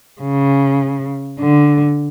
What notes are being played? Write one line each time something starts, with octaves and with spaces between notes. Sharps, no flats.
C#3
D3